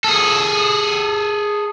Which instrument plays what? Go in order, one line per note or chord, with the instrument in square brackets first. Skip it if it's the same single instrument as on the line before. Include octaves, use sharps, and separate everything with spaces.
[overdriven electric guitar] G#4 A4